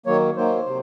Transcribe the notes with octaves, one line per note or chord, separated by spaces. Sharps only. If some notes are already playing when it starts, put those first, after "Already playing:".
D#3 F#3 A#3 C#5
D#3 F#3 A#3 C5
C3